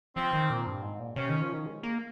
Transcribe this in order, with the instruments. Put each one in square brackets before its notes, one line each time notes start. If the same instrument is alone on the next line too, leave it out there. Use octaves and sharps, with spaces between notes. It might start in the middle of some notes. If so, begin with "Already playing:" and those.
[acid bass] F3 [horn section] C4
[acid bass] D#3
A#2
G2
G#2
A#2
[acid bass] C3 [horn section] C#4
[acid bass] D#3
F3
D#3
G#3
A#3